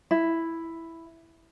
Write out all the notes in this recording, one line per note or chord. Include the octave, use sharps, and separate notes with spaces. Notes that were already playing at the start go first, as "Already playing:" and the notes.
E4